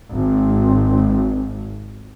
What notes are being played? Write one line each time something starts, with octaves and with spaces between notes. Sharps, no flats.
G#1 C4